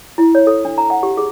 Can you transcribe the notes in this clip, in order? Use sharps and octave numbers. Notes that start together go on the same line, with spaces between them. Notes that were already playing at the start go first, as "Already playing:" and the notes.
E4
C#5
A4
D4
A#5
F#5
G4
G#4